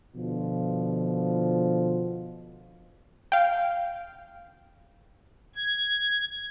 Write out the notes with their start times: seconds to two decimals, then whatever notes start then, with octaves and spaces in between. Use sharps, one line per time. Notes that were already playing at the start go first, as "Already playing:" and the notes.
0.15 B2 D3 F3
3.32 F5 G5
5.56 G#6